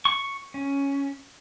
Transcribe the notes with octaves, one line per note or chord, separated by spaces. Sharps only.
C#6
C#4